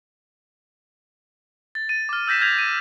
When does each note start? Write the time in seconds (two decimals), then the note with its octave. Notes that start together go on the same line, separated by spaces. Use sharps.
1.75 A6
1.89 A6 D#7
2.09 D6 F6
2.27 E6 G6 A#6 B6 E7
2.41 F6 G6 G#6 A#6 B6 F7
2.58 D#7